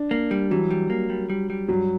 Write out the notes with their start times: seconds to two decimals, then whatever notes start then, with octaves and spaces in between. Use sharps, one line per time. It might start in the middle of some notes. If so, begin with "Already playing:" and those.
Already playing: D4
0.11 A#3
0.31 G3
0.51 E3 F#3
0.71 G3
0.90 A#3
1.10 G3
1.30 G3
1.50 G3
1.68 G2 F#3